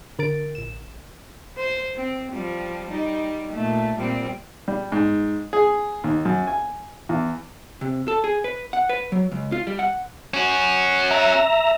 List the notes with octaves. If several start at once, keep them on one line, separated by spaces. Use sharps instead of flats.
D3 A#4 A6 D7
A1 E7
C5
C4
F3 G3
G3 D#4
A#2 A3
A#2 G3 C4
G3
G#2
G#4
D#2
F#2
G#5
E2
C3
A4
G#4
B4
F#5
B4
F#3
C#2
F4
G3
F#5
C#4 F#4
E5 A#5